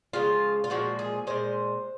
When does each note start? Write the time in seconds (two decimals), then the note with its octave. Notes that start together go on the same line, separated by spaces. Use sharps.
0.13 C#3 F3 G#3 F4
0.64 F4
0.70 A#2 F3 G#3 F#4
0.99 G#4
1.27 A#2 G#3 C5